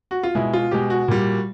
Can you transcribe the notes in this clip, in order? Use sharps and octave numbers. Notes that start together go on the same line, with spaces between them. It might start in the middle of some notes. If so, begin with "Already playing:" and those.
F#4
F4
B2 G#3 E4
F4
B2 G#3 G4
F#4
A#2 G3